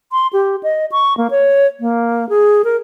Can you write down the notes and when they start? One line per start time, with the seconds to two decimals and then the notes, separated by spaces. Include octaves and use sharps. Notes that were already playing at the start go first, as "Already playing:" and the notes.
0.12 C6
0.33 G4
0.63 D#5
0.92 C#6
1.17 A#3
1.31 C#5
1.80 A#3
2.29 G#4
2.64 A#4